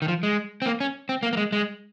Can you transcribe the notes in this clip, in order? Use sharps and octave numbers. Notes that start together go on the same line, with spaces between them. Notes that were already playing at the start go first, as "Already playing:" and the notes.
D#3
F3
G#3
C4
A#3
C#4
C4
A#3
A#3
G#3
G#3